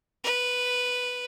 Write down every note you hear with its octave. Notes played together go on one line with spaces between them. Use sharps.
B4